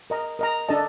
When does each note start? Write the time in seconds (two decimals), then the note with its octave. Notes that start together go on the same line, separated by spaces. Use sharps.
0.10 A#4 D#5 A#5
0.39 A#4 D#5 A#5
0.69 D4 A4 D#5 A5